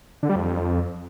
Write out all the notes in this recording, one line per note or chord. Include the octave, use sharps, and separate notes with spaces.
D3
G3
F2